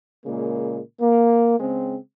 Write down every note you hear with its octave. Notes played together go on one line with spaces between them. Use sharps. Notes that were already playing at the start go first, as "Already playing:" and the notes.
A#2 C#3 G#3 A#3
A#3
C#3 G#3 C4